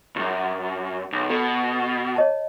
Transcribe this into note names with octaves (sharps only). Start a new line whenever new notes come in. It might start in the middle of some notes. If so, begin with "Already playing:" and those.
C#2 F#2
B1
B2 A4
C#5 D#5 A5